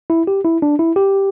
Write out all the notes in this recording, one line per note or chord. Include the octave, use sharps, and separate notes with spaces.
E4
G4
E4
D4
E4
G4